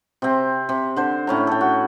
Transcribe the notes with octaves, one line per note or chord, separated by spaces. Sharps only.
C3 C4
C3
D3 C5
A2 C#4 A#5
A4 G5
F#4